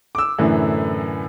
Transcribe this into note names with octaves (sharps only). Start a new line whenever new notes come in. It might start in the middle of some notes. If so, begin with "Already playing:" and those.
D6 E6
F#2 A2 D3 E3